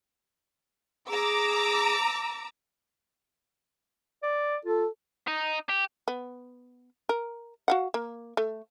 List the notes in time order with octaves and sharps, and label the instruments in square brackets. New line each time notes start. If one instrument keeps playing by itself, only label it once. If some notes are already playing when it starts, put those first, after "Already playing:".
[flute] G#4 [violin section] A#5 D6 E6
[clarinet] D5
[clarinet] F4 [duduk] A4
[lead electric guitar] D#4
G4
[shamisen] B3
A#4
F#4 F5 F#5
A#3
A3